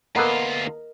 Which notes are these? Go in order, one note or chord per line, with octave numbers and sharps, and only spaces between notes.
D2 A#3 B3 F4 A4 A#4 D#5